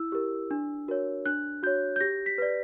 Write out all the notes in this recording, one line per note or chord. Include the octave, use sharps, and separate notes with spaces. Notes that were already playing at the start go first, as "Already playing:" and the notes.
Already playing: E4 E6
G4 A#4
D4
F#4 A#4 C#5
D4 F#6
F#4 C#5 G6
G6
G4 A#6
B6
B4 D5